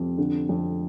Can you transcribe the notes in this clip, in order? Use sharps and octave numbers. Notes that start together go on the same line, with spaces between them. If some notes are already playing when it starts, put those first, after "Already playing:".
Already playing: F2 C3
D3
F2